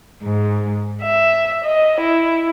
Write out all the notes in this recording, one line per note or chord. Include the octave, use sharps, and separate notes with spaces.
G#2
E5
D#5
E4